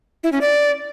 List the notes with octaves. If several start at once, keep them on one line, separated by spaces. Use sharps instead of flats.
E4
C#4
D5